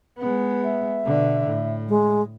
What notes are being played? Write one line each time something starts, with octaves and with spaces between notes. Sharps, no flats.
G#3 B3
E5
B2 D3
A2
G#3